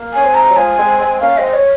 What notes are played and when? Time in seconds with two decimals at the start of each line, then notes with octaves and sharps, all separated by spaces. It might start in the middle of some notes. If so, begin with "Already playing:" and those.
Already playing: A#3
0.13 C#4 G#5
0.23 G#3 C4
0.35 A#5
0.49 F#3
0.56 F3 G#3 G#5
0.78 G#3 C4
0.99 G#3 C4
1.21 A#3 C#4 F5
1.37 G#3 C4 D#5
1.54 C#5